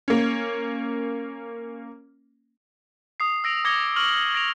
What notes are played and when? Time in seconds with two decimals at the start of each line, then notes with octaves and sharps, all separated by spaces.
0.08 A#3 C#4
3.20 D#6 C7
3.44 E6 A#6 D7 F7
3.64 D6 D#6 G#6 A#6 C#7 G7
3.96 C#6 F6 F#7
4.35 A#6 D7 F7